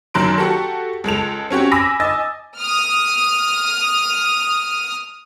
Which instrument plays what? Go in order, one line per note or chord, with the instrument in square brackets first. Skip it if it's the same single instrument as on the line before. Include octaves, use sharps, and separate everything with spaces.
[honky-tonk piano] F#1 F#2 D#3 F#3 C6 D7
F#4 G4 A4
C#2 G#3 A4 F7
C4 C#4 F#4 G4
G#5 B5 D6 E6 A#6 B6
D#5 G#5 E6 A6
[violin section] D#6 F6